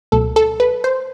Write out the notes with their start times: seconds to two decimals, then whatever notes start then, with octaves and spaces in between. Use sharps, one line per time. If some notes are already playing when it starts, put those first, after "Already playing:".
0.12 C#2 B2 F#3 A3 A4
0.36 A4
0.60 B4
0.84 C5